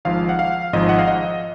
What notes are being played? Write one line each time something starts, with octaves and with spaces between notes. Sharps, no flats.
G#1 G#2 F3 F5
F#5
F5
G#1 G#2 F3 D#5
F#5
F5
D#5